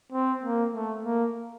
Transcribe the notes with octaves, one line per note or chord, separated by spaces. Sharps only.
C4
A#3
A3
A#3